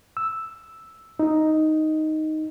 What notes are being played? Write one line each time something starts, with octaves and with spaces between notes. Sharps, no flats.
E6
D#4